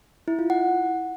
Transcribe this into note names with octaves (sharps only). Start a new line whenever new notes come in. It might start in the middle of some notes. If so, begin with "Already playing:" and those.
E4
F4
F#5